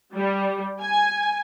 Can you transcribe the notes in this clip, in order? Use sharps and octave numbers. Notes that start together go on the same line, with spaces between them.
G3
G#5